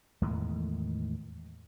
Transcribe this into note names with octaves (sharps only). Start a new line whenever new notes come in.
E2 A2 D#3 G#3